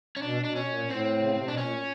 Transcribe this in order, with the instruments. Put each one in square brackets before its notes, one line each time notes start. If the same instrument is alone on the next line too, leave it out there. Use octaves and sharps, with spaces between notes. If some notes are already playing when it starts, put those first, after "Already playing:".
[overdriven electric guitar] C#4
[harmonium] B2 [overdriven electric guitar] D4
[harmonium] B2 [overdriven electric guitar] D4
[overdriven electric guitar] C#4
[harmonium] A#2
[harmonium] A2 [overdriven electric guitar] C4
[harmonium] C#3
C3
[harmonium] B2 [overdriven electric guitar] D4
[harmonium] A#2 [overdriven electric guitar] C#4